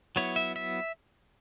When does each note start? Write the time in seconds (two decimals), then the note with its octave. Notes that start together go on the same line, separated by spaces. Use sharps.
0.16 F#3 B3 E4 C#5
0.36 E5
0.56 E5